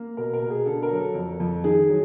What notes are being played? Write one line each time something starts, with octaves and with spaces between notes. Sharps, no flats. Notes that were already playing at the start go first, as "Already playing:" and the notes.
Already playing: A#3
B2 A#4
A#4
B2
G#4
D3 A4
A#4
F#3
A4
F2
F2
D#3 G#4
F#3